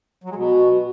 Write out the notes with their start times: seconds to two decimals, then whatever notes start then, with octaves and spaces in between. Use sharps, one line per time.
0.24 F#3
0.30 G#3
0.36 B2